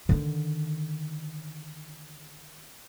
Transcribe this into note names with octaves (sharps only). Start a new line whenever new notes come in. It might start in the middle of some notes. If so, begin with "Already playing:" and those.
D3 D#3